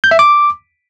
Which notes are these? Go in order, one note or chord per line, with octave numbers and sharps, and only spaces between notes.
G6
E5
D6